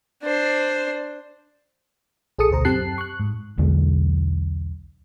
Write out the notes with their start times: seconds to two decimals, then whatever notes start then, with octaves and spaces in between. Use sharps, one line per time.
0.23 D4 C5
2.39 A#1 G#4 A4 A5 D#6 C#7
2.50 D2 B2 C5 A#5
2.65 F#2 C4 G4 A5 F#6 C7
2.98 C#6 F#6
3.20 G#2
3.58 B1 E2 D3 G#3